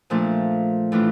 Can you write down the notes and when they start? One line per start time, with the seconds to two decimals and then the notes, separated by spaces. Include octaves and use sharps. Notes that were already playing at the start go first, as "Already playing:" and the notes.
0.10 A#2 F3 A3 D4
0.92 A2 E3 A3 D4 F4